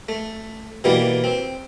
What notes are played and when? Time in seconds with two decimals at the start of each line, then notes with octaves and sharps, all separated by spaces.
0.09 A3
0.84 B2 E3 G3 A#3
1.24 C4